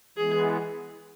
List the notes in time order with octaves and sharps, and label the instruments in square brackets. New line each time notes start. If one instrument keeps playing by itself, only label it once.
[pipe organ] E3 G#3 B3 [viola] G#4